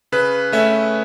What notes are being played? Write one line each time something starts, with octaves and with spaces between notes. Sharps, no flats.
C#3 B4
A3 C#4 E5